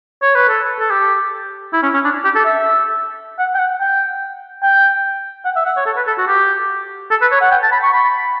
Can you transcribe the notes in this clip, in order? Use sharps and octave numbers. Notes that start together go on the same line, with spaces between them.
C#5
B4
A4
A4
G4
E4
C#4
C#4
D4
G4
A4
E5
F#5
G5
F#5
G5
G5
F#5
E5
F#5
C#5
A4
B4
A4
F#4
G4
A4
B4
C#5
F#5
G5
A5
B5
C#6
B5